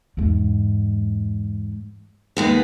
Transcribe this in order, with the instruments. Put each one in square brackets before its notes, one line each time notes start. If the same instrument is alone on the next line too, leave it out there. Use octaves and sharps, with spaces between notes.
[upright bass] E2 G#2
[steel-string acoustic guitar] D#2 G#3 B3